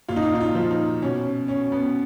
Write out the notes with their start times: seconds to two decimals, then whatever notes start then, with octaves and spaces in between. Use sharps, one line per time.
0.08 A#2 F4
0.16 D#4
0.22 F4
0.35 D#4
0.40 F4
0.55 F3
0.71 D#4
1.02 B2 C#4
1.48 C#4
1.72 B3